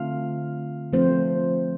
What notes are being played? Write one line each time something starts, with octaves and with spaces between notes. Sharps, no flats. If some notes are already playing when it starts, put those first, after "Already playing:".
Already playing: D3 A3 C4 F4 F5
F3 A3 C4 C5